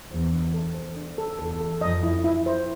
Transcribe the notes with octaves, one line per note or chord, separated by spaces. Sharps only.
E2 E3 C5
D4
A4
C5
D4
A4
E2 E3 A4
A4
F2 F3 D#5
E4
E4
C5